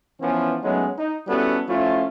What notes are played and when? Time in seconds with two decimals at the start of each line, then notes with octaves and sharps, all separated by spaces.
0.20 E3 F3 B3 C#4
0.63 F#3 G#3 A3 B3 C#4 D#4
0.98 D#4
1.27 G3 B3 C#4 E4 F#4 A4
1.67 F3 A3 C#4 E4 F4